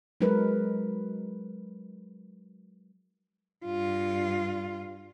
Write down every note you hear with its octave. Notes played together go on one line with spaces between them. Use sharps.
F#3 G#3 D#4 A#4 B4
G2 F4